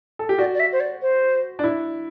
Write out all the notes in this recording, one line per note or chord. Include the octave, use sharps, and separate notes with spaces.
A4
G4
F#4 D5
D5
E5
C5
D5
C5
D4
E4